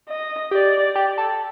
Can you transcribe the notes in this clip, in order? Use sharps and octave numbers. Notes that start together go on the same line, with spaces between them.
D#5
G4 D5
G4
A4